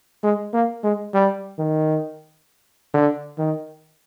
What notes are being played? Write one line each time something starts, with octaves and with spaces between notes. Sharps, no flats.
G#3
A#3
G#3
G3
D#3
D3
D#3